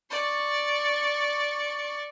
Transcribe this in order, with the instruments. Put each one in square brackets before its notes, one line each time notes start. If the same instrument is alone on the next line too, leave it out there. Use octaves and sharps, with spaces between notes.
[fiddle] D5 C#6